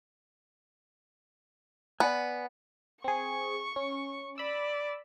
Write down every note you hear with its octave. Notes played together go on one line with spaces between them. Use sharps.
B3 D5 F#5 G#5
C4 G#4 C#6
C#4
D5 B5 E6